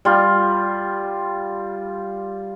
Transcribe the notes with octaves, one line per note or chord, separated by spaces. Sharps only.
G3 F4